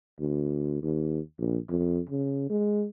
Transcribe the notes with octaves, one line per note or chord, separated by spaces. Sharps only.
D2
D#2
A#1
F2
C#3
G#3